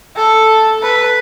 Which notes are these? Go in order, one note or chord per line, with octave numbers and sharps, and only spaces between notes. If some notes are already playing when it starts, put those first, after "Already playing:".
A4
B4